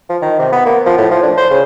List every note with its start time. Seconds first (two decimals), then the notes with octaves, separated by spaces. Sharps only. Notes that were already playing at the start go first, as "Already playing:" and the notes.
0.09 F3
0.22 D#3
0.39 C3
0.52 B3
0.66 A#3
0.86 F3
0.98 A2
1.11 F3
1.23 D4
1.38 C5
1.50 C#3